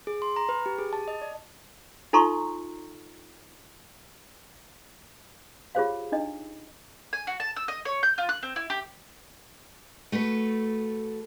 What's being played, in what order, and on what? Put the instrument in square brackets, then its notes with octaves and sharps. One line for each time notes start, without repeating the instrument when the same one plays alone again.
[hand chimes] G#4
C6
A#5
B4
G4
G#4
A5
D#5
D5
[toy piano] D#4 F4 A4 A#5 C6 C#6
F4 G4 G#4 C5 C#5 F5
D4 D#4 D#5
[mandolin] G#5
F#4
A5
E6
D#5
C#5
G6
F4
F#6
C4
E4
G4
[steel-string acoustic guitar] A3 F#4 A4 B4